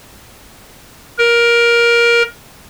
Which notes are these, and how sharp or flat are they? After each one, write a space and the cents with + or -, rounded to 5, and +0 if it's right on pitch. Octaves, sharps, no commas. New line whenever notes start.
A#4 +15